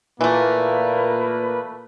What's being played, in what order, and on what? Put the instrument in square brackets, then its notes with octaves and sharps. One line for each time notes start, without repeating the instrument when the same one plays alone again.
[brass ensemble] A#2 A#3 [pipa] E3 A3 [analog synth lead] B4